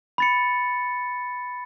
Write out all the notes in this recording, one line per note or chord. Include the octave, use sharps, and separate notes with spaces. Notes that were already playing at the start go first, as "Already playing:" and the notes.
B5 A6 C#7